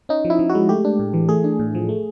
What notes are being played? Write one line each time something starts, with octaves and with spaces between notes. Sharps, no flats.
C#4 D#4
F3
E4
F3
F#4
G#3
A3 G4
D4
A2
E3
A3 G#4
D4
A2
F3
A3